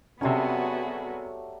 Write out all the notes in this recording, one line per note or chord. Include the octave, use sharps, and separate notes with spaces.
C3 F#3 G3 A3 B3 C#4 F#4 G#4